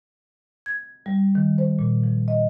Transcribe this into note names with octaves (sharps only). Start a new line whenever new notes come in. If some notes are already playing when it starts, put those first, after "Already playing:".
G#6
G3
D#3
C5
A#2
F3
D#5